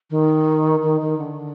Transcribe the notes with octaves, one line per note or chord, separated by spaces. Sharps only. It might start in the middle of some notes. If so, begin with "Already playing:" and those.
D#3
D#3
D#3
D3